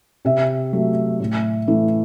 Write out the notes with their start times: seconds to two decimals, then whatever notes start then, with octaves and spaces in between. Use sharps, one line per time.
0.25 C3 E5
0.73 F#3 A3
1.20 A2
1.68 E3 A3